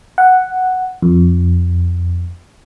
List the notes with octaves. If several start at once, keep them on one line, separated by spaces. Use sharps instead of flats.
F#5
F2